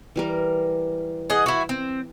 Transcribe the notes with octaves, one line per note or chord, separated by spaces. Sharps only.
E3 G3 A#4
G#4 D#5 F#5
E4 F#4
C4